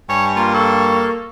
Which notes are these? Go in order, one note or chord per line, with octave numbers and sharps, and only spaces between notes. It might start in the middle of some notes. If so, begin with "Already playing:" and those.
G2 C#5 G#5
A#3 F4 A#5
A4 C#6